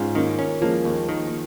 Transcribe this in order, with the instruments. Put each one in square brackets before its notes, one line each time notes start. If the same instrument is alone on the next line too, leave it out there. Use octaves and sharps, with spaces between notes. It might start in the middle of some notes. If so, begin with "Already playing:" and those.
Already playing: [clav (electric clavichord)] G#2 [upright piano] C#4 F4
[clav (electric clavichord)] D#3 [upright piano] A#3 C#4
[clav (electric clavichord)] C#4
[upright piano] F3 G#3 [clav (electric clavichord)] A#3
[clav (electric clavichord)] D#2
D#3